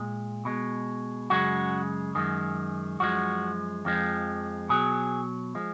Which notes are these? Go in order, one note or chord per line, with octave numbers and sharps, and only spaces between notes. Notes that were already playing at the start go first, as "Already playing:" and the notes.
Already playing: A#2 G#3
B2 G#3
F#2 C#3 G#3 F#4
F#2 D#3 G#3
F#2 F3 G#3 F#4
F2 F3 G#3
B2 F#3 G#4
F3 G#3